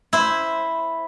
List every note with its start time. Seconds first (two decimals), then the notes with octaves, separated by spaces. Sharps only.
0.13 E4 C5